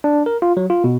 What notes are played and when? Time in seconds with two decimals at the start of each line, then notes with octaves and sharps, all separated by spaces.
0.04 D4
0.26 A#4
0.42 F4
0.57 F#3
0.70 F4
0.84 B2